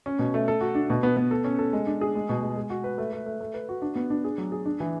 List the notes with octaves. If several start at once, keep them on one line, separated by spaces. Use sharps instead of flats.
C#4
B2
A3
A4
F#4
D4
B2
B3
B3
A4
C#4
A4
G#3
D4
G#4
G#3
B2
G#3
G#3
F#4
B4
A3
A3
A3
A3
B4
F#4
D4
B3
D4
G#4
F#3
G#4
D4
E3